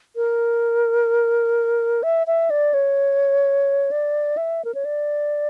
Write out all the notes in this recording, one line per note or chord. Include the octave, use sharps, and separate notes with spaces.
A#4
E5
E5
D5
C#5
D5
E5
A#4
C#5
D5